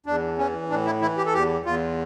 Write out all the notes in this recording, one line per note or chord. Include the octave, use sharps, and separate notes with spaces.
E2 D4
E3 C#4
A2 D4
E4
E3 E4
G4
A4
E2 G4
E2 F4